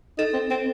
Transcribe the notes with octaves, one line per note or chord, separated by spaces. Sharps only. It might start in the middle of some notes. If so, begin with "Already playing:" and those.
D#4 A4
C4
C4